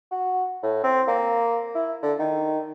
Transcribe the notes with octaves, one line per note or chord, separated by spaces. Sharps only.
F#4
A2
C4
A#3
E4
D3
D#3